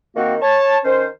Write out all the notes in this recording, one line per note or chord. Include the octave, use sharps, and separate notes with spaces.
D#3 A#3 C4 F#4
C#5 A5
D#3 C#4 C5